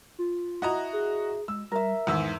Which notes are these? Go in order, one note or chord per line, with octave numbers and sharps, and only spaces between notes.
F4
E4 F#4 D#5 A#5
G#4
G#3 E6
G3 A#4 E5
E2 G#2 D#3 E6